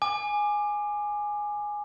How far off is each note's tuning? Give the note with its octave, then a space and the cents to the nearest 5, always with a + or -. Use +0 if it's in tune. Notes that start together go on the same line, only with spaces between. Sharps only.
G#5 +0 D6 +20